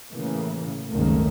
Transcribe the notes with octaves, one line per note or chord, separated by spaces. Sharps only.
A2 C#3 E3 A#3
F#1 C#2 G#2 D#3 A3 A#3